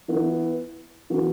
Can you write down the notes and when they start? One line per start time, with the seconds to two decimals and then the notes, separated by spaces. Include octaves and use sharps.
0.08 E3 B3 E4
1.10 E3 B3 F#4